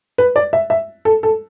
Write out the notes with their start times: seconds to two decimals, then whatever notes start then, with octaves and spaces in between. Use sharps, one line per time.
0.18 B4
0.36 D5
0.53 E5
0.70 E5
1.05 A4
1.23 A4